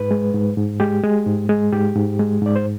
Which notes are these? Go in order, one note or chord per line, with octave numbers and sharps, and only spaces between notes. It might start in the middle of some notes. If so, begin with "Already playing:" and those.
Already playing: G#2 B4
G#3
G#2
G#2
G#3 G4
G#3
G#2
G#3
G#2 G4
G#2
G#3
G#2 D5
C5